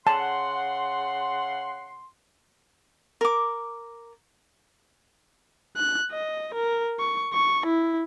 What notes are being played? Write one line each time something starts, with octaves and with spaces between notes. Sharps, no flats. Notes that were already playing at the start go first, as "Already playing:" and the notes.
C#3 F#5 A5 C6
A#4 D6
F#6
D#5
A#4
C#6
C#6
E4